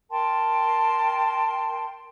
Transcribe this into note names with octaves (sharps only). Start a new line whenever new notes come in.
A#4 G5 A5 C6